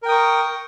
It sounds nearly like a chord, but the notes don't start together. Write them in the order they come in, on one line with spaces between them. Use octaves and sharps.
A#4 G5 D#6 C#6